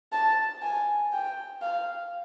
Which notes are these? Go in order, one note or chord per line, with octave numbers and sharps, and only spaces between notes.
A5
G#5
G5
F5